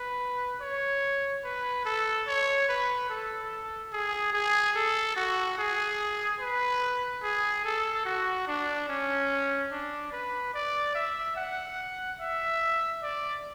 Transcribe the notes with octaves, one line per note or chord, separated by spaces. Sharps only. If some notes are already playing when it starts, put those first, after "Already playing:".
Already playing: B4
C#5
B4
A4
C#5
B4
A4
G#4
G#4
A4
F#4
G#4
B4
G#4
A4
F#4
D4
C#4
D4
B4
D5
E5
F#5
E5
D5